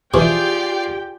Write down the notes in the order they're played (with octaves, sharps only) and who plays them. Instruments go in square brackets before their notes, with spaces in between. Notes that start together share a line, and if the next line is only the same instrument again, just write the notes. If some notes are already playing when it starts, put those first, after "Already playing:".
[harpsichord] C3 E3 F3 [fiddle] F4 D5 [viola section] G4 G5 [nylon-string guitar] G#4